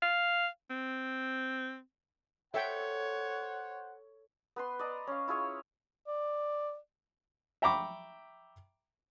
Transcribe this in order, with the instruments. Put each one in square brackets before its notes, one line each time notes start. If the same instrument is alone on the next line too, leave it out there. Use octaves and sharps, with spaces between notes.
[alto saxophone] F5
C4
[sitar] A4 [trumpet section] C5 F#5 [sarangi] C#5 [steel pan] E5 G5
[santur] B3 B4 C6
D5 D#5 A#5
C#4 F5
E4 F4 G#4 C#5
[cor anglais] D5
[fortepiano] E5 G5 A#5 B5 C#6 D6